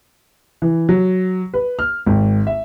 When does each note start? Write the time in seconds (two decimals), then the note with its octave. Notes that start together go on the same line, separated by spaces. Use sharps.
0.62 E3
0.89 F#3
1.54 B4
1.79 F6
2.06 G#1
2.47 E5